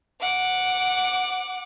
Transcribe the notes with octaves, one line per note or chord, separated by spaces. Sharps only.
F#5 D6